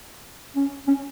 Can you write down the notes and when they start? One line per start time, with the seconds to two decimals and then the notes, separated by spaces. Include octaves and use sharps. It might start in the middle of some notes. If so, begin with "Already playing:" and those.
0.56 C#4
0.88 C#4